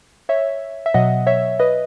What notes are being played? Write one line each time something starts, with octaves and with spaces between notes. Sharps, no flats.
C#5 E5
E5
B2 F#3 D#5 F#5
C#5 E5
B4 D#5